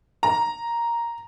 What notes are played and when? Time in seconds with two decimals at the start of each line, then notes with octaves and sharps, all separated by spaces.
0.23 A#5